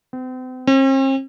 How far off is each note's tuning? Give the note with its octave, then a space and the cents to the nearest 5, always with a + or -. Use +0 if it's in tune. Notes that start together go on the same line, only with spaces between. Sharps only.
C4 -40
C4 +45